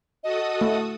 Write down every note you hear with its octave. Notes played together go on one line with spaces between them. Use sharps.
F#4 A4 D#5 D#6
A3